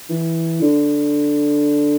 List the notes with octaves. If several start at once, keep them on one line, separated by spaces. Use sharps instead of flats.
E3
D3